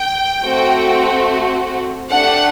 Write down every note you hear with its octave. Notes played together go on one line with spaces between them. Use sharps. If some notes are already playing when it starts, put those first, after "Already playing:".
Already playing: G5
A3 C4 F#4
A3 D4 G4 F#5